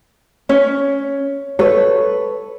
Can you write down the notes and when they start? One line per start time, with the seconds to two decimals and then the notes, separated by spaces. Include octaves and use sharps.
0.49 C#4 C#5
1.59 A4 B4 C#5